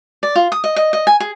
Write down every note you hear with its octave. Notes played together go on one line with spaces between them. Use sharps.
D5
F4
D#6
D#5
D#5
D#5
G#5
G#4